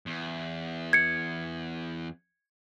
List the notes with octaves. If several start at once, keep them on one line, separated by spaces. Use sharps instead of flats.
E2
G#6 C#7